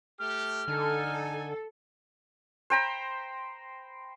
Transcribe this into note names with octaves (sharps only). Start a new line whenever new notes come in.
A3 G4 F6
D3 D#4 A4 G#5
C5 G5 A#5 B5